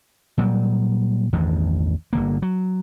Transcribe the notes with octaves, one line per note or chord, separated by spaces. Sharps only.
A#2 F#3 G3
A1 E2 G2 D#3
G1 D3 A#3
F#3